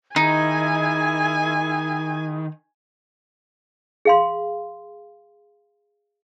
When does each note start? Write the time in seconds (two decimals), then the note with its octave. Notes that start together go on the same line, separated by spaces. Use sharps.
0.16 D#3 D#4 E4 G#4 G#5
4.05 G#4 F5 C6